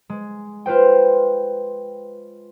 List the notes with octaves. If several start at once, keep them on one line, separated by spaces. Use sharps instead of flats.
G#3
F4 B4 C5 G5